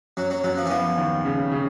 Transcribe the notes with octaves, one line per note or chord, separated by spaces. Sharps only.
F#2 F#3
F#3
F#2 F#3
F3
E3
F3 B3
D#2
C#3
C#3